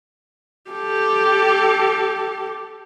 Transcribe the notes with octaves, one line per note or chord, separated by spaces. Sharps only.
G4 A4